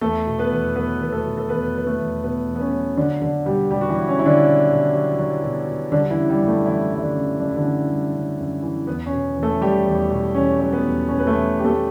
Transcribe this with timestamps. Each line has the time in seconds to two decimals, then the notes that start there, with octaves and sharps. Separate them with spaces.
0.01 E2 A3 A4
0.27 B2
0.39 B3 B4
0.51 E2
0.75 F#3 B3 B4
1.01 E2 B4
1.12 A3 A4
1.25 B2
1.37 A4
1.49 E2 B3 B4
1.75 F#3 B4
1.86 A3 A4
1.99 E2
2.23 B2 B3
2.48 E2
2.55 B3
2.60 C#4
2.73 F#3
2.97 D3 F#3 D4
3.22 D3 F#3 D4
3.46 B2 G3 G4
3.71 B2 G3 G4
3.81 F#4
3.89 E3 E4
3.95 F#3
4.08 C#4
4.19 F#3 E4
4.26 D3 D4
4.44 B2
4.70 B2
4.93 F#3
5.19 F#3
5.43 B2
5.67 B2
5.92 D3 G3 D4
6.11 E3 E4
6.17 C#3
6.29 G3 G4
6.42 F#2
6.47 A3 A4
6.66 E3 E4
6.91 G3 E4
7.03 D3 D4
7.15 C#3
7.40 F#2 D4
7.49 E4
7.56 D3 D4
7.64 E3
7.89 G3
8.13 C#3
8.38 F#2
8.63 E3
8.87 E2 B3
9.06 C#4
9.12 B2
9.36 E2
9.43 A3 A4
9.61 F#3 G3 G4
9.86 E2
10.11 B2
10.35 E2 C#4
10.60 F#3
10.72 B3
10.85 E2
11.08 B2 C#4
11.19 B4
11.27 A3 A4
11.34 E2
11.59 F#3 G4
11.65 A3 A4